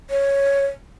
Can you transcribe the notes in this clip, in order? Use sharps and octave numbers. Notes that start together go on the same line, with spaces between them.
C#5